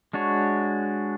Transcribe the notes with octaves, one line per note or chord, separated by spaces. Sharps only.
G#3 D4 F#4 C#5